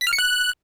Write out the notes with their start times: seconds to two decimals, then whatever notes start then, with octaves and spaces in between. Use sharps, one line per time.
0.01 B6
0.07 F6
0.13 C#7
0.18 F#6